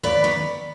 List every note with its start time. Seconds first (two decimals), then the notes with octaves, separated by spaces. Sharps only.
0.03 D#2 B4 D5
0.24 D#3 B3